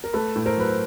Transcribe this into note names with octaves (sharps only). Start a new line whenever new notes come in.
A#4
A3 A4 B4
A2
A#4 C5
F#3 B4
C5